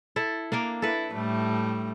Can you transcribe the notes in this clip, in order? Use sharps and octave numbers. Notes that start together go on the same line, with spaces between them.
E4 A4
A#3 D4 A#4
E4 A4 B4
A2 G3 A3